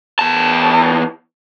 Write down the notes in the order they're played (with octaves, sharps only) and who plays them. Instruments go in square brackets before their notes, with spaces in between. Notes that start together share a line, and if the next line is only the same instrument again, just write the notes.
[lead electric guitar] E2 A5